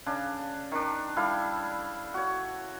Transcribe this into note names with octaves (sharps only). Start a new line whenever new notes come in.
C#3 D4
D#3 D4
G3 E4 A4 F5
F#4 C#5